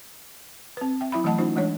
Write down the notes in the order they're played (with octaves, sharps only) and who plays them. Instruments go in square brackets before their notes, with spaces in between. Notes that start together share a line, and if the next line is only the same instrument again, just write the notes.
[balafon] C4 B4
E5 G5
F#3 E4 E5 B5
E3 F#3 A3 D#5 F#5 A5
C#4 D#4 F4 C5
E3 G#3 D4 C#5